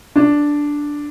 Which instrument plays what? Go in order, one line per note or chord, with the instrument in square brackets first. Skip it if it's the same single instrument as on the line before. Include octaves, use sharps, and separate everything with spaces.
[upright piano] D4